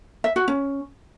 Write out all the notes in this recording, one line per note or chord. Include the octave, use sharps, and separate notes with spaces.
E5
F#4
C#4